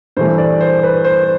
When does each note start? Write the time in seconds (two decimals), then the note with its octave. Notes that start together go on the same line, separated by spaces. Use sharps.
0.17 G2 E3 A3 C5
0.38 D5
0.61 C5
0.83 B4
1.05 C5